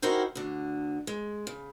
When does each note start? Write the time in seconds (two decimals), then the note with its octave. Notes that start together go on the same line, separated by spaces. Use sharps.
0.02 D#4 E4 F#4 A#4 C5 G5
0.35 D2 D3
1.07 G#3
1.47 C#3